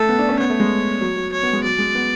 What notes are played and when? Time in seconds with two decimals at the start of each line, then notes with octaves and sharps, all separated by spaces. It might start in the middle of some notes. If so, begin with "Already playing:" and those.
Already playing: A3 A4
0.09 B3
0.19 D4
0.29 C#4
0.39 B3 C#5
0.50 A3
0.60 G#3
1.01 F#3
1.17 F#3
1.33 C#5
1.43 B3
1.53 G#3
1.64 F#3 D5
1.79 G#3
1.95 B3